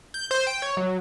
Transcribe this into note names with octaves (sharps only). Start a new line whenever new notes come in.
G6
C5
G5
C#5
F#3